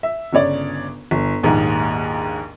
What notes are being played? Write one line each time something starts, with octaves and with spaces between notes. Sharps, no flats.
E5
G1 C#3 C#5 D5
G1
A#1 D#2 G#2